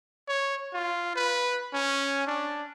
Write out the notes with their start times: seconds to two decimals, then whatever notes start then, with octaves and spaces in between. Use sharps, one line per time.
0.28 C#5
0.73 F4
1.15 B4
1.73 C#4
2.27 D4